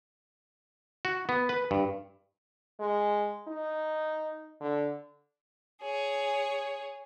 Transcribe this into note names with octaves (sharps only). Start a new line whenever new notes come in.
F#4
B3
B4
G2
G#3
D#4
D3
G#4 C#5